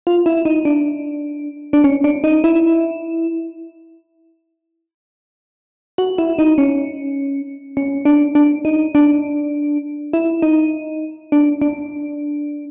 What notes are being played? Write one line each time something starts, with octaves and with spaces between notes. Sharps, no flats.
F4
E4
D#4
D4
D4
C#4
D4
D#4
E4
F#4
E4
D#4
C#4
C#4
D4
D4
D#4
D4
E4
D#4
D4
D4